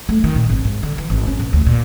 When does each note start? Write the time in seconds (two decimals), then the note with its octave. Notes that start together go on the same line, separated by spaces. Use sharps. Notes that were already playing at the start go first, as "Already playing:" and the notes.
0.09 A3
0.24 D#3
0.36 A#2
0.50 G#1
0.65 G#2
0.83 D3
0.98 E3
1.10 G#1
1.27 C#4
1.40 A#1
1.53 D2
1.67 A#2